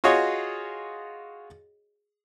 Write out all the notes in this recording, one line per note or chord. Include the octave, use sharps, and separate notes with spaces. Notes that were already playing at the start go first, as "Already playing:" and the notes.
F4 F#4 G#4 C#5 D#5